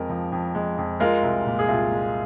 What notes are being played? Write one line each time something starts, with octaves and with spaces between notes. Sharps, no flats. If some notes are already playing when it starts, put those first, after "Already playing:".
Already playing: F2 G#3 A#4 D#5
F3
F2
G#3
F2
G#3 F4 A#4
C2
A#2
G#4
C2 F4
G#3